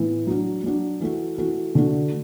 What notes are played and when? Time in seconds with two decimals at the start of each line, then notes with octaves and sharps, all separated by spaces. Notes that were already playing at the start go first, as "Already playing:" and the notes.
Already playing: A2 E3 B3 E4
0.27 F#3 D4 F#4
0.64 F#3 D4 F#4
1.00 E3 A3 F#4
1.38 E3 A3 F#4
1.75 D3 A3 F#4